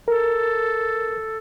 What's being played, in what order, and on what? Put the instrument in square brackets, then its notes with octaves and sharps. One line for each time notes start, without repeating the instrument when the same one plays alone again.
[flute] A4 [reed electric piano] A#4